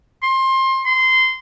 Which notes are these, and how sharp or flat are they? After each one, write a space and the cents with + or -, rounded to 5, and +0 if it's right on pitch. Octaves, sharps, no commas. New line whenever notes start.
C6 +25
C6 -15